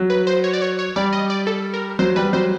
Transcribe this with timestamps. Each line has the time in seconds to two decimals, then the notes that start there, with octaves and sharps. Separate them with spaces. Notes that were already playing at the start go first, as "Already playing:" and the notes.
Already playing: F#3
0.10 B4
0.27 C5
0.44 C#5
0.53 D5
0.62 C#5
0.79 C#5
0.96 G3 D5
1.13 D#5
1.30 D5
1.47 A4
1.74 A#4
1.99 F#3 C5
2.16 G3 B4
2.33 F#3 C5